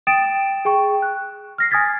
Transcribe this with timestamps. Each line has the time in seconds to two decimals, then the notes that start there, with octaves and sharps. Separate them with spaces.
0.07 G5 D#6 A6 D7 E7
0.65 G#4 G5 C#6
1.02 F#6
1.58 F6 A#6 C7
1.71 G#5 D#6 F6 G#6 A6 B6